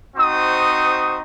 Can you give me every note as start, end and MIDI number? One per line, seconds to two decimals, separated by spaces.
0.17 1.21 60
0.17 1.21 63
0.17 1.21 66
0.17 1.21 72
0.17 1.21 85
0.17 1.21 87